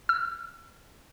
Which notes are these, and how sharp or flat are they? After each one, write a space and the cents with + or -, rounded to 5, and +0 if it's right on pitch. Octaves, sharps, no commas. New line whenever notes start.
E6 +35